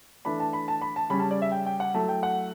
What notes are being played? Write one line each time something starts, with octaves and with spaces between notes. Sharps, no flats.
E3 A3 D4 B5
A5
B5
A5
B5
A5
C#3 G3 C#4 B5
A5
D5
E5
G5
G5
F#5
F#3 A3 E4 A5
G5
F#5